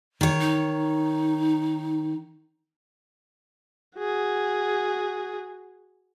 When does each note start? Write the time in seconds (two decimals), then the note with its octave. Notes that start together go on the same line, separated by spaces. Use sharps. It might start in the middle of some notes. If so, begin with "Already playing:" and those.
0.21 D#3 C#5
0.41 D#4
3.98 F#4 G#4